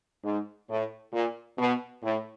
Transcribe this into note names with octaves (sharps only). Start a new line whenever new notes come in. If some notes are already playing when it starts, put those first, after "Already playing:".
G#2
A2
A#2
B2
A2